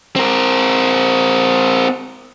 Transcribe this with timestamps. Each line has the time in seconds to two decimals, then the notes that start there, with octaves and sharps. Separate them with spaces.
0.16 C4 A#4